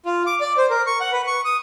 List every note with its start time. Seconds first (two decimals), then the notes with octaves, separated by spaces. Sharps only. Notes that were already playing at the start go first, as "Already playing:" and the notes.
0.06 F4
0.27 D6
0.41 D5
0.57 C5
0.70 A#4
0.87 C#6
1.01 F#5
1.12 B4
1.27 C#6
1.45 D#6